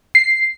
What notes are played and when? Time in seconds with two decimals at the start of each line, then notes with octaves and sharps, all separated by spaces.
0.15 C7